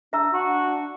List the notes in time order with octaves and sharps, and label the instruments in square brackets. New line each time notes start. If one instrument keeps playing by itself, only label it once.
[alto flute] D4 [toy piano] E5 A#5 E6
[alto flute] D4 [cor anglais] F#4